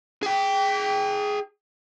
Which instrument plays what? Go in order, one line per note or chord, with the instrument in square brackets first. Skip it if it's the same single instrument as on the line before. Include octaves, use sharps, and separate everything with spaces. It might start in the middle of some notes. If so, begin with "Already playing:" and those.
[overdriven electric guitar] G#4 G5